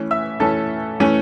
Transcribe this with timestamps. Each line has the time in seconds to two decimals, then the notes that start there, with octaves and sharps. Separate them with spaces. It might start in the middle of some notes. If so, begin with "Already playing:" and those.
Already playing: E3 A3 C#4
0.11 E5 E6
0.40 E3 A3 C#4 A4 A5
1.00 E3 A3 C#4